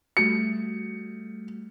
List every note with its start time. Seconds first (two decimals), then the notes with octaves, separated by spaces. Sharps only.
0.17 G3 A3 F#4 C#7